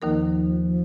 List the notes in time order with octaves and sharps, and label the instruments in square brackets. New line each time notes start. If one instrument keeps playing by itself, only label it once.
[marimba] D#2 D#3 A#3 D#4 A#4 [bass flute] F3